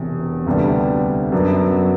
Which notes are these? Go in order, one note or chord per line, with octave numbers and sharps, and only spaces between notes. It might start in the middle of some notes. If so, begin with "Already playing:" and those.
Already playing: E1 E2 C3
D2 C3 G3 B3 D4
F#2 F#3 B3 D4